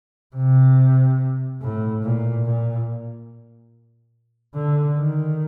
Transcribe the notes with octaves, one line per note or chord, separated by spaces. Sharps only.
C3
A2
A#2
A#2
D3
D#3